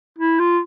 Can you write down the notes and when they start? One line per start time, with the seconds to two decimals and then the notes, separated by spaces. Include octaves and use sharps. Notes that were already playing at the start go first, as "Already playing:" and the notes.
0.18 E4
0.39 F4